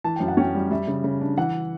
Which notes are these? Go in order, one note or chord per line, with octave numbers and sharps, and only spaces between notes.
E3 A5
F#2 G5
F#5
C#4 G5
G3
G3 E5
C#3
C#3
D4
E3 F#5